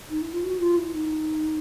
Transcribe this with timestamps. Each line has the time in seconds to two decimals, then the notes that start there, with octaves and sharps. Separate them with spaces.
0.09 D#4
0.21 E4
0.33 F4
0.43 F#4
0.60 F4
0.77 E4
0.94 D#4